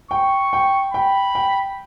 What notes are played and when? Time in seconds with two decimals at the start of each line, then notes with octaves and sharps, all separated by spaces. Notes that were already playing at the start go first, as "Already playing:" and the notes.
0.11 G5 C#6
0.53 G5
0.93 G5 B5
1.35 G5